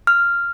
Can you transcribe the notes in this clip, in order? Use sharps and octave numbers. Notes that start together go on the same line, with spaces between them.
F6